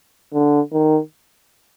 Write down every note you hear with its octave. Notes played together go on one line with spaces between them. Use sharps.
D3
D#3